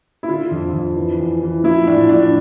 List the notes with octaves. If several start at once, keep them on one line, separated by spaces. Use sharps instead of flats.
E4
D3 F4
F2
F2
E3
E2
E3
F3 E4
A2 D4
F3 D4